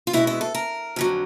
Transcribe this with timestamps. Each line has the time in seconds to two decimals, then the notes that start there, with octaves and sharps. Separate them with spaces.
0.07 F4
0.13 B2 G#3 B3 E4
0.27 E4
0.41 A4
0.54 A#4
0.96 F2 D3 F#3